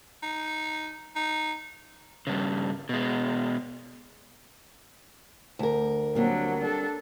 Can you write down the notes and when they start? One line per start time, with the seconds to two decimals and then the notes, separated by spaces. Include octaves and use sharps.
0.23 D#4
1.15 D#4
2.27 G2 C#3
2.89 B2 G#3
5.59 D2 A#4
6.15 F#3 G3 A#3 C4 D4
6.60 D4 A4